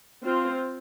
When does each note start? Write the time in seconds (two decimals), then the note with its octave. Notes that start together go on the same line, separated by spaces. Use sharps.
0.24 C4 F4 C5